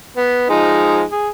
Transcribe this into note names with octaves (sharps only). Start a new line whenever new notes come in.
B3
F3 G#3 D#4
G#4